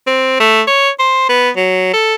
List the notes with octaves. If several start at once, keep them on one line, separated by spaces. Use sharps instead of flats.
C4
A3
C#5
C5
B3
F#3
A4